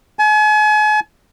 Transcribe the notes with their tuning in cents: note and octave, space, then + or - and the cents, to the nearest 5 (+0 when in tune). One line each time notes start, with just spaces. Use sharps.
G#5 +40